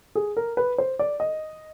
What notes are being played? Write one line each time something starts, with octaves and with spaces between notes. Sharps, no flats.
G#4
A#4
B4
C5
D5
D#5